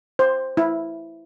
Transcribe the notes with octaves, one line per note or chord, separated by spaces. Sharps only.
C5
E4